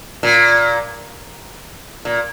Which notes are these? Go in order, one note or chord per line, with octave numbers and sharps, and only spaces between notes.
A#2
A#2